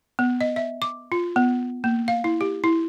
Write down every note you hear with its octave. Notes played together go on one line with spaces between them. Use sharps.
B3
D#5
E5
D6
F4
B3
A#3
F5
E4
G4
E4